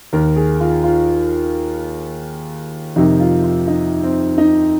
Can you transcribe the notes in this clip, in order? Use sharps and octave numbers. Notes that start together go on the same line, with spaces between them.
D#2 D#3 A#4
G#4
F4
F4
F2 C3 D#3 D#4
F4
F4
D#4
C4
D#4